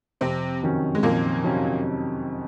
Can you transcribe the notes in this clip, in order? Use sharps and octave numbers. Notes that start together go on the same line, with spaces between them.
F2 C3 C4
C3 D#3 F#3 C#4
G#3
F2 A#2 A#3
C3 D#3 F#3 C#4